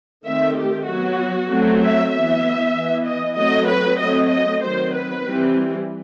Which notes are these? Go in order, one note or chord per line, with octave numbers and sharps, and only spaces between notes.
D#3 A3 C4 E5
G4
F#3 B3 F#4
F#3 A3 C4
E5
E3 B3 E5
E3 B3
D#5
F#3 A3 C4 D#5
B4
F#3 A3 C4 D#5
D#5
D#3 F#3 C4 C5
B4
E3 G3 C4